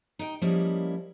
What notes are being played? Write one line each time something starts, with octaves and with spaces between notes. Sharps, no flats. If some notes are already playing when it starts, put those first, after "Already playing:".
D#4 G5
F3 G3 G#3 A#3 C#4 E4